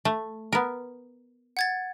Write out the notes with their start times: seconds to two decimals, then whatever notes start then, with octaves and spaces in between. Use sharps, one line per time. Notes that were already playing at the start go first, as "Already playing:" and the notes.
0.05 A3
0.52 B3 A#4
1.57 F#5 G#6 A6